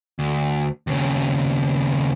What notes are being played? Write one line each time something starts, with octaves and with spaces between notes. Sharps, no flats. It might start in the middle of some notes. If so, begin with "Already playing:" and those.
D2
D#2 C#3